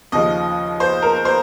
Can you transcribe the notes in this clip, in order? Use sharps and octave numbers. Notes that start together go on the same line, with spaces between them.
D#2 C#3 F3 D#5
C5
A#4
C5